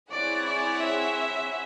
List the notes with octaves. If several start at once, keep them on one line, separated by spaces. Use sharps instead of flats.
C4 E4 G#4 C#5 D5 F#5
D5
E5